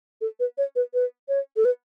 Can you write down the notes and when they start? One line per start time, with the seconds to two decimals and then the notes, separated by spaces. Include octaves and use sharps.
0.21 A4
0.40 B4
0.58 C#5
0.76 B4
0.94 B4
1.28 C#5
1.56 A4
1.65 B4